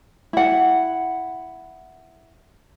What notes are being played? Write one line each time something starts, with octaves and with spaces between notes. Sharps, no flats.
E4 F#5